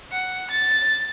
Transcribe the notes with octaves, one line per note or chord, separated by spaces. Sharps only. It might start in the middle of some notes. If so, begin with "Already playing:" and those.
F#5
A6